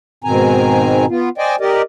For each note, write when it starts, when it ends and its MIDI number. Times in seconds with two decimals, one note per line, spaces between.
0.24 1.06 44
0.24 1.06 47
0.24 1.06 51
0.24 1.06 60
0.24 1.06 80
0.24 1.06 82
1.09 1.29 59
1.09 1.29 65
1.38 1.56 72
1.38 1.56 74
1.38 1.56 75
1.38 1.56 79
1.38 1.56 80
1.60 1.82 67
1.60 1.82 70
1.60 1.82 74
1.60 1.82 75